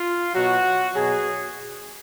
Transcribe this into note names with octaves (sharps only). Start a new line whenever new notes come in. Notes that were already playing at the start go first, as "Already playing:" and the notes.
Already playing: F4
B2 F#3 F#4
B2 F#3 G#4